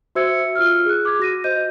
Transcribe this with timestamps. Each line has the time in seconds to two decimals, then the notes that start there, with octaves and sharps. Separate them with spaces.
0.15 F#4 C5 E5 E6 G#6 C#7
0.55 F4 E6 F6
0.85 G#4 F#6
1.05 D6 G#6
1.20 F#4 A#6 D#7
1.44 F#4 C5 D#5 G6 D#7